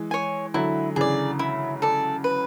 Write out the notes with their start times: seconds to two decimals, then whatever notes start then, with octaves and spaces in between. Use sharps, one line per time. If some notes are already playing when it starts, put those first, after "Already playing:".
Already playing: E3 G#3
0.11 C#5 G#5
0.54 D3 F#3 E4
0.96 C#3 E3 G#4 D5
1.39 E4
1.82 A4 D5
2.24 B4